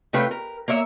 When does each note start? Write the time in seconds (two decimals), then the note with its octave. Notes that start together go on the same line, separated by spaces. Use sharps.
0.13 C3 A3 F4 B4 C#5 G5
0.31 A#4
0.68 A#3 A#4 C#5 E5